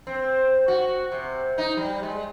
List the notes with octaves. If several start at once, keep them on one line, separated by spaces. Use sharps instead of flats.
C4
F#4
C3
D#4
G3
G#3